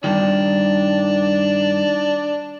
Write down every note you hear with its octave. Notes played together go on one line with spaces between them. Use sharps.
G2 D#3 D4